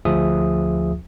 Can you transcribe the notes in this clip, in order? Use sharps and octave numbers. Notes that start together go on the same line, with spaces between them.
D2 F3 F4 G#4 E5 D#6